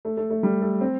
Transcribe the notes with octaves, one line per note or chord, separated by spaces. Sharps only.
A3
A3
A3
G3
A3
C4